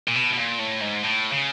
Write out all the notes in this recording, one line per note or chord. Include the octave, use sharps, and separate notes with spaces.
A#2
B2
B2
A#2
A2
G#2
A2
C#3